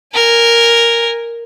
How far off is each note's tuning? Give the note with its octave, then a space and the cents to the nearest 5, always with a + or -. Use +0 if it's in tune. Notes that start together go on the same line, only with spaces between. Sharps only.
A#4 +0 G#5 -10